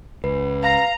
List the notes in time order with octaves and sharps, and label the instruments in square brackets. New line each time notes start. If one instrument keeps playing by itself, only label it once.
[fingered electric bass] C#2 [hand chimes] B4
[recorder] F5 [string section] A#5